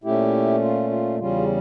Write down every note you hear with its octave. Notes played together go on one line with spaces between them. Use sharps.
A#2 A3 C#4 E4 G4
F4
F4
E2 C#3 G3 C#4 F4